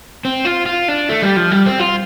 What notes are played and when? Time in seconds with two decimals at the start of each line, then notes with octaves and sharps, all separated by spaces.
0.25 C4
0.45 F4
0.66 F4
0.88 D4
1.09 A3
1.23 G3
1.37 F3
1.51 G3
1.66 C4
1.79 F4